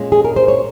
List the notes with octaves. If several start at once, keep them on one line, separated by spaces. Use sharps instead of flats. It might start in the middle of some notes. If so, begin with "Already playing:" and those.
Already playing: A#2 G#3 C#4
G#4
A#4
C5
C#5